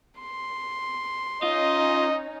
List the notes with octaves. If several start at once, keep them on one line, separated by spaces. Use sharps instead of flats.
C6
C#4 D#4 F4 D#5